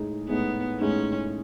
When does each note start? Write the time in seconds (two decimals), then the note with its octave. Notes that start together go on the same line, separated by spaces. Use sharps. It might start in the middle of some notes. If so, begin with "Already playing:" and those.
Already playing: A2 G#3 D#4 G#4
0.29 A2 G#3 B3 D#4 G#4
0.80 A2 G#3 C#4 D#4 G#4